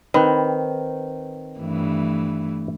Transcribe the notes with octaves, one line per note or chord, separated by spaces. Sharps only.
D#3 C4 B4
G2 E3 A3